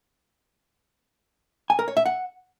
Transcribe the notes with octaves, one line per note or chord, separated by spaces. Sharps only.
G#5
A#4
C#5
E5
F#5